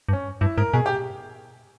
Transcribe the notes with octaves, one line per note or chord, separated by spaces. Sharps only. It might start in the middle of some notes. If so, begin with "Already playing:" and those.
G2
C#4
G2 E4
G#2 A#4
B2 G#4
G4